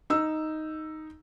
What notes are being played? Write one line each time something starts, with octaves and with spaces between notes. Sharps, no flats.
D#4 E6